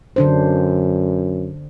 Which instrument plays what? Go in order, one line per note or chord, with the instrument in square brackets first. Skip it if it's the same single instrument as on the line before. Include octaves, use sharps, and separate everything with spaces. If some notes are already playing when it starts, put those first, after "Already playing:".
[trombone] F#2 [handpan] D3 D4 C5